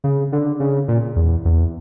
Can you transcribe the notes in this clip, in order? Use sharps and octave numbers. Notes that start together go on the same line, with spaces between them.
C#3
D3
C#3
A#2
E2
E2